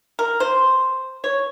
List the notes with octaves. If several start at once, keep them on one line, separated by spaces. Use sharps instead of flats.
A#4
C5
C#5